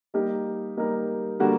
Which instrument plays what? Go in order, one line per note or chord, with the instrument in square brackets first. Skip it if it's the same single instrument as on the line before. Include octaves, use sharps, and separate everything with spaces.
[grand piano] G3 A#3 D#4 G4 A#4
G3 A#3 D#4 G4 A#4
D3 G3 A#3 F#4